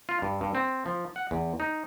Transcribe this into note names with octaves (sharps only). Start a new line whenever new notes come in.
F4
G2
G2
C4
F3
F#5
E2
D#4